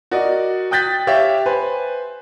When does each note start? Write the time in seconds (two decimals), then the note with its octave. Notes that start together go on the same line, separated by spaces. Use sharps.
0.11 F#4 A#4 D5 D#5
0.71 G5 D#6 F#6 G6 A6 B6
1.07 G4 C#5 E5 F5
1.46 B4 C5 G#5